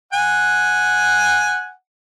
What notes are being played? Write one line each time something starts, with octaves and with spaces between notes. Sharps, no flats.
F#5 G#5